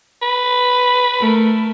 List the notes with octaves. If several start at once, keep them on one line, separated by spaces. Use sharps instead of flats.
B4
A3 A#4